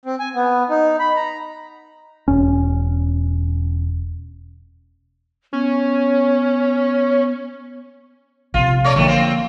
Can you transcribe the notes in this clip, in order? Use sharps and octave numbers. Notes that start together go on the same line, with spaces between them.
C4
G#5
B3
D#4
B5
A#5
E1 C#4
B3 C#4
A#1 C3 F4
A3 C#5 D5
D3 D#3 F3 A3 A#3
C4 F4